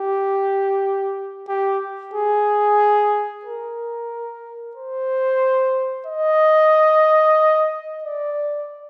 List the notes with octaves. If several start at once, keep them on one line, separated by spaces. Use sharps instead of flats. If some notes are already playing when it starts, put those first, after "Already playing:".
Already playing: G4
G4
G#4
A#4
C5
D#5
D5